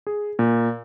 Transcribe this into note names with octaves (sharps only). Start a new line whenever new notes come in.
G#4
A#2